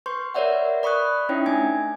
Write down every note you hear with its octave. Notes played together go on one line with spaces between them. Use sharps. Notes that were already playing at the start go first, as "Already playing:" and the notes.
B4 C6 C#6 G6
A#4 B4 C#5 D5 E5 F#5
D5 B5 C#6 D#6 F#6
C#4 D#4 E4 C#5 E5 G5
A3 D4 G#5 G#6